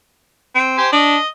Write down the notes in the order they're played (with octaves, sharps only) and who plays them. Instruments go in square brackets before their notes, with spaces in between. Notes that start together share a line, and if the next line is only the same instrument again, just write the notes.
[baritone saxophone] C4
[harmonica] G4 C5 G#5
[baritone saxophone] D4 [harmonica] D#5